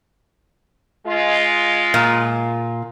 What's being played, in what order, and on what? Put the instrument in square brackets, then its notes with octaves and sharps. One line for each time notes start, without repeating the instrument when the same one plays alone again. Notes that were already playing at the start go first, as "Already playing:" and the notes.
[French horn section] G#3 F4
[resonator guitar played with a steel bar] A#2